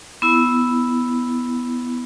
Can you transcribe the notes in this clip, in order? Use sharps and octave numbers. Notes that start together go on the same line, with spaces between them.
B3 E4